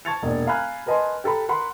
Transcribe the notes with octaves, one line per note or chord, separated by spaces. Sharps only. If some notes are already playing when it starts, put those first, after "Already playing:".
A5 C#6 G#6 A6 C#7 F7
E1 A#2 D4
F5 G#5 A#5 B5 F6 F#6
A#4 B4 D#5 G#5 A5 C6
G4 A4 A#5 B5
A#4 F#5 B5 C6